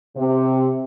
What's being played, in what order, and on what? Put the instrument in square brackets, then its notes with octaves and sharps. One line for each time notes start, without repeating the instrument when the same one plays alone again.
[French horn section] C3